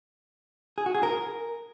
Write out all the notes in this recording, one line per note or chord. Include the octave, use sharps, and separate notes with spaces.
G#4
F#4
G#4
A#4